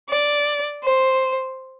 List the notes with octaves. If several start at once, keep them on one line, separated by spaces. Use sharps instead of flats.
D5
C5